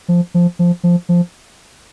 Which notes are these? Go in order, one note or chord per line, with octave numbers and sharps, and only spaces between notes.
F3
F3
F3
F3
F3